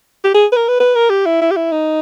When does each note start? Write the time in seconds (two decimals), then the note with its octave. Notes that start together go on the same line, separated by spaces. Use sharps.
0.24 G4
0.34 G#4
0.52 B4
0.56 A#4
0.68 B4
0.80 B4
0.95 A#4
1.10 G4
1.26 E4
1.42 E4
1.51 G4
1.56 E4
1.72 D#4